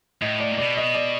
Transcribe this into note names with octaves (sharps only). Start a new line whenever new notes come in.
A2 D#5
D5
A#2
B2 D5
D#5
D5